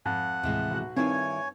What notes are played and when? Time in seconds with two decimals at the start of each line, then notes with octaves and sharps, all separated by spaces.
0.06 F2 G#2 F#5
0.43 D#2 A2 C3 E3 G#3
0.71 B1 F#4 F#6
0.97 G2 D#3 G3 C4 D#4 E4 C#5 G#5